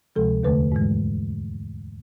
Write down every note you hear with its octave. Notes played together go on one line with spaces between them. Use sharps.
D2 C3 F3 G#3 A4
E2 D3 A3 B4
G#2 E3 G#3